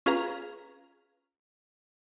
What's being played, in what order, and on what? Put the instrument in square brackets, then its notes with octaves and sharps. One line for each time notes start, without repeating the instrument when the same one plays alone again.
[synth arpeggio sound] C#4 F4 G#4 B4 F5 A#5